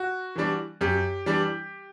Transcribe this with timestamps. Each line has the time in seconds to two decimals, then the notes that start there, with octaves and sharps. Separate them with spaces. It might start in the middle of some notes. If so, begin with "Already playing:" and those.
Already playing: F#4
0.35 E3 G3 D4
0.81 F#2 G4
1.26 E3 G3 D4